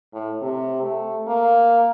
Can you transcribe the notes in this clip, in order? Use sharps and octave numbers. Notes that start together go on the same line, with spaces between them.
A2
C3
A3
A#3